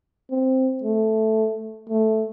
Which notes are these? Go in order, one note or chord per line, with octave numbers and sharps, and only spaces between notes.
C4
A3
A3